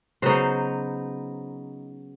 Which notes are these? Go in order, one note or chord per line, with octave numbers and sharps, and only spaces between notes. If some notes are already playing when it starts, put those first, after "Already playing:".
C#3 F#3 B3 D#4 C5